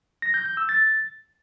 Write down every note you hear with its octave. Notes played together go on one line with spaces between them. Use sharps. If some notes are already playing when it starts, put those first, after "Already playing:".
A#6
G6
G6
E6
A6